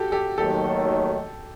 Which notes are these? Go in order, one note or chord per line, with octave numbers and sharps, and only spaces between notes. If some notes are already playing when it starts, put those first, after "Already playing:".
Already playing: F#4 G4 A4
G4 A4
D#2 D#3 F#3 A3 G4 A4